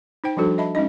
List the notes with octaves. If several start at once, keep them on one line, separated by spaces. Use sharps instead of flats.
D#4 C5 G5
F3 G3 D4 F#4 A4 C5
D#5 E5 A5 B5
G#3 C#4 D#4 D#5